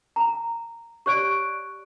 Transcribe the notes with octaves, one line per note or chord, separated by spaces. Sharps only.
A#5
G4 C#5 D5 C#6 F#6 D7